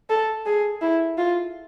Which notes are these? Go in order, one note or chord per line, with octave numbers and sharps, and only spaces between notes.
A4
G#4
E4
F4